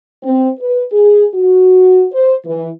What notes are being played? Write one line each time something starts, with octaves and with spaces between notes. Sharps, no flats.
C4
B4
G#4
F#4
C5
E3